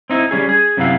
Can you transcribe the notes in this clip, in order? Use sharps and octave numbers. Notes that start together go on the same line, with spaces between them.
C4 D#4 E4
G3 C#4 G#4
G#4
F#2 C3 E3 B3 E4 F5